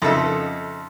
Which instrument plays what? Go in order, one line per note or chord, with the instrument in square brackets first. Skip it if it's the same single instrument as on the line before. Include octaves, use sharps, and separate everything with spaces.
[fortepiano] F2 C#3 D#4 A4 E5 E6